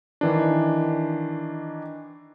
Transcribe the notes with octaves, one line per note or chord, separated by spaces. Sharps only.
D#3 E3 D4